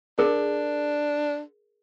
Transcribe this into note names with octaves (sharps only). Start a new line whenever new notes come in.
D4 G#4 A#4